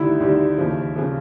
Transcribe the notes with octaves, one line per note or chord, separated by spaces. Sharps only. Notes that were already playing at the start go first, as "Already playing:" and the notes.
Already playing: D2 C3 D#3 G3 E4
D2 C3 D#3 G3
D#2 C#3 F3
C#3 F3